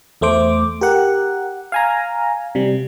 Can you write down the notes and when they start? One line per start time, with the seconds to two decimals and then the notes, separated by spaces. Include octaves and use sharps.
0.21 E2 A3 C5 D6
0.81 G4 A#4 F#5
1.72 F5 G#5 A#5
2.55 C3 G3